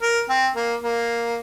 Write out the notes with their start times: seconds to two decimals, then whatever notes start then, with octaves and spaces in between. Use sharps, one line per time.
0.02 A#4
0.29 C4
0.56 A#3
0.83 A#3